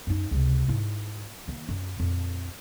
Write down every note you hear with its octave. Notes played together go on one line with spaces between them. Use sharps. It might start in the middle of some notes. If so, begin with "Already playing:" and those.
F#2 D#4
C#2 C3
G#2 E4
D#3 A#3
F#2
F2 A#2